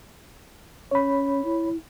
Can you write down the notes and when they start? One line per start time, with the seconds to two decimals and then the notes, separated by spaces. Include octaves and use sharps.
0.91 C#4 C#5 B5
1.45 E4